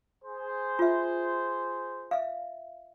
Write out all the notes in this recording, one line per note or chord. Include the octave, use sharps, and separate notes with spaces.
G#4 C5
F4 E5
E5 F5